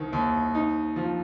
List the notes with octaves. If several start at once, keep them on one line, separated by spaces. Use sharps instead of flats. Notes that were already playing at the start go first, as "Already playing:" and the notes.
Already playing: C2 D#3
D#2
D#4
F3